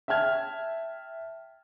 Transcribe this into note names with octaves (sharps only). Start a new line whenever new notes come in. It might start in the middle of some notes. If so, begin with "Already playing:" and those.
E5 G5 A5 F6 G#6